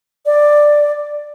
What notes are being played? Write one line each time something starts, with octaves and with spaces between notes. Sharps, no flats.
D5